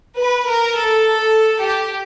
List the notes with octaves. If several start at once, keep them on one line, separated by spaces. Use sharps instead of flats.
B4
A#4
A4
G4